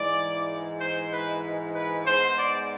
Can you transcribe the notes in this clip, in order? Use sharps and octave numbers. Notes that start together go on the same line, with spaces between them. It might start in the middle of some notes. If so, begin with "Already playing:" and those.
Already playing: G#2 E3 G#3 D5
C5
B4
B4
G#2 G#3 B3 C5
D5